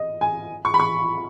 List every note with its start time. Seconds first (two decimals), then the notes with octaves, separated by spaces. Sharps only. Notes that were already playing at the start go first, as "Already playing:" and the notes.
Already playing: D#5
0.21 G#5
0.65 C#6
0.74 B5
0.80 C#6